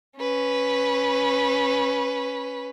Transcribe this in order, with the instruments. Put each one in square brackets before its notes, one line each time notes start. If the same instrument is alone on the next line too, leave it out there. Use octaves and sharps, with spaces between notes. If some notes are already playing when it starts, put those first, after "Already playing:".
[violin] C#4 B4